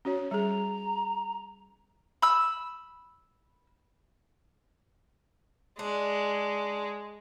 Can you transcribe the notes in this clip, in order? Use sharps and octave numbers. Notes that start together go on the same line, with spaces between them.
C#4 F#4 C#5
G3 G#4 A#5
B5 E6
G#3 D4